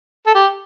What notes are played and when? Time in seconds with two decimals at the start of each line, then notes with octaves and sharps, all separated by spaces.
0.26 A4
0.34 G4